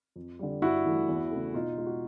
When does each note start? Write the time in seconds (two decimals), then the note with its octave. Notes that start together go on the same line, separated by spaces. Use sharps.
0.16 F2
0.39 D3 G3
0.62 G2 E4 F#4
0.85 E3 A3
1.08 E2
1.31 C#3 E3 A3
1.54 B2 D#4 F4
1.78 G#3 F4
1.86 F#4